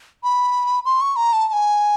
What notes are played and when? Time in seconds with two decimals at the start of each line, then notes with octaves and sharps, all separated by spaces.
0.23 B5
0.85 C6
1.01 C#6
1.16 A#5
1.33 A5
1.48 A5
1.53 G#5